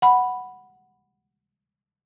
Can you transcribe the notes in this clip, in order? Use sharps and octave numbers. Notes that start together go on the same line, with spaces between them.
F#5 B5